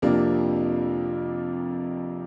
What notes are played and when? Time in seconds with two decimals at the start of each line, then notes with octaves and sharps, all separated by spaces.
0.02 F2 C3 F3 A#3 D4